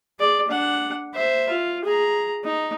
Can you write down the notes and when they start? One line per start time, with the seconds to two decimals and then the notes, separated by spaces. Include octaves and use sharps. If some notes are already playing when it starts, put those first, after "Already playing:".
0.20 G#4 D5
0.48 D4 F#5
1.14 C5 E5
1.50 F4
1.84 G#4 A#5
2.44 D#4